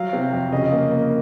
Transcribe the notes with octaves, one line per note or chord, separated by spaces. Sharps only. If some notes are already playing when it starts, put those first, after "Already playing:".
Already playing: F#3 F5
C3
F2
C#3 D#5
A#3
A#3